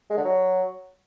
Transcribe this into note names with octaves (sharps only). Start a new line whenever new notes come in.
G#3
D3
F#3